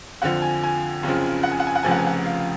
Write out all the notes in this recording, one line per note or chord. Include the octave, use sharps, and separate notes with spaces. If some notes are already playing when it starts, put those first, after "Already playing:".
F2 D3 F3 F#5
G#5
G#5
F#1 F2 C#3 F3
F#5
G#5
F#5
G#5
F#5
F1 F2 C#3 F3 G#5
F#5
G#5
F#5
F5